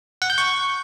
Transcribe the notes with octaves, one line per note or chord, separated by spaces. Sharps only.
F#5
G6
C#6